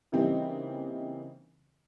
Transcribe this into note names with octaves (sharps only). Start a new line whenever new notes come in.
C#3 E3 G3 A#3 C4 D#4